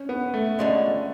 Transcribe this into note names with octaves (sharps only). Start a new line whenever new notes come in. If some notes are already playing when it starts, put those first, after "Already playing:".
Already playing: C#4
B3
A3
D3 F3 G#3 C#4